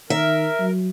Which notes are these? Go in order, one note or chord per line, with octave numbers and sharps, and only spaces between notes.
D#3 A#4 E5
F#3